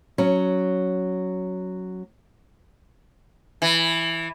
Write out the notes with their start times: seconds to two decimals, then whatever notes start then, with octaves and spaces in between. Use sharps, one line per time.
0.18 F#3 C#4
3.62 E3